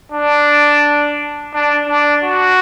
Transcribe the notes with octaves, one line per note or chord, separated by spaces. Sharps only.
D4
D4
D4
F#4